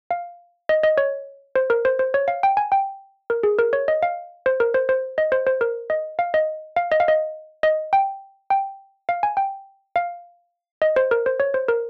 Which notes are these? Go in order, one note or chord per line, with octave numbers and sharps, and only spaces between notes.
F5
D#5
D#5
C#5
C5
A#4
C5
C5
C#5
F5
G5
G#5
G5
A#4
G#4
A#4
C#5
D#5
F5
C5
A#4
C5
C5
D#5
C5
C5
A#4
D#5
F5
D#5
F5
D#5
F5
D#5
D#5
G5
G5
F5
G#5
G5
F5
D#5
C5
A#4
C5
C#5
C5
A#4